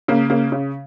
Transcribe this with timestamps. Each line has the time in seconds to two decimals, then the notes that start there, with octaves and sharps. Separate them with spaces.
0.08 C#3 A#3
0.30 C#3 A#3
0.52 C#3